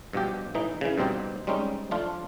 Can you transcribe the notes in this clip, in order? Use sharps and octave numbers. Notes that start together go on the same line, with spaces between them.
G2 B2 F3 G4
A2 E3 D#4
C#3 E3
G2 B2 C4 D#4 G4
G3 G#3 C4 C#4 D#4
F3 A3 D4 F4